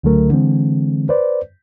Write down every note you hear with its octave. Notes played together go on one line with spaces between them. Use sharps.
C#2 D3 F#3 A3 A#4
D3 E3 G#3 C4
B4 C5 D5